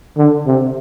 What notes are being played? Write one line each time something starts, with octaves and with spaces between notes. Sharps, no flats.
D3
C3